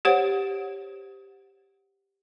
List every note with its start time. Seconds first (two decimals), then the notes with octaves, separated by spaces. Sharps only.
0.05 G4 C5 C#5 F#5